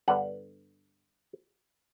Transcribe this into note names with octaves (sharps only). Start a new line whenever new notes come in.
G2 D3 G3 B3 F#5